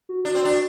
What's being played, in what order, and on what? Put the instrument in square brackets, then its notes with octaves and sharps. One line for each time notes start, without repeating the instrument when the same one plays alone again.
[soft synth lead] F#4
[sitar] D4 [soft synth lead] F#4
[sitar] C4
D4